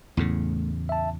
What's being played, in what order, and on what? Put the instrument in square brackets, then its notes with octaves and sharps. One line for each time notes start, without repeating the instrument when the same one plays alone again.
[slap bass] E2 A2 C#3 [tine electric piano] A3
[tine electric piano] E5 A5